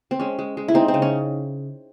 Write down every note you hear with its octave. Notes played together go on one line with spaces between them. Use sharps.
C4
G#3 C#4
G#3
G#3
E4
G#3 C4 D#4
C4
C#3
C#4